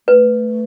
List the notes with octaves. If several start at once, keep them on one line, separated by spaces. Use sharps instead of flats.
A3 B4